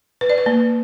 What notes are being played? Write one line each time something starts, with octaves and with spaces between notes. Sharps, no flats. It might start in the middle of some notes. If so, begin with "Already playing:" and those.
B4
D5
B4
A#3